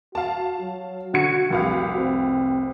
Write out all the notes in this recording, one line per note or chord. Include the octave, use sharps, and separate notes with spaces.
F#4 F5 A5
F#3
D3 F#4 G#6 C#7
F1 C2 F#4 F5
C4